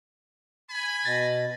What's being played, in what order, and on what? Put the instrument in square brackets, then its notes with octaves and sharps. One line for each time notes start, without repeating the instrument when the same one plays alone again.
[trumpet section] G#5 B5
[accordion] B2 [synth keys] A6 A#6